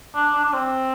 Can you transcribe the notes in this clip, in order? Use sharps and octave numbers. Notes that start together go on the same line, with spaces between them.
D4
D4
D4
C4